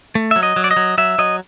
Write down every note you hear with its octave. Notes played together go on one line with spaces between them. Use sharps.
A3
F#3 E5
D#5
F#3
D5
D#5
F#3
F#3 E5
F#3 D#5